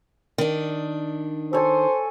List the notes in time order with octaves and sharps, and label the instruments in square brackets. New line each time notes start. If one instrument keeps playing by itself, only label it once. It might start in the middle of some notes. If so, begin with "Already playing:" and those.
[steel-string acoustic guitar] D#3 D4
[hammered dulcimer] A4 C#5 G#5 [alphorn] C5